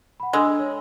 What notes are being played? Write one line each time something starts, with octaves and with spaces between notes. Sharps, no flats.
F#5 B5
G#3 D4 A4 E6
C#5